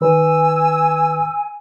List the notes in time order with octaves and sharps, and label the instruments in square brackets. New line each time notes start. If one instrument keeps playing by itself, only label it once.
[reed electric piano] D#3 B4 [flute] G#5 [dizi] E6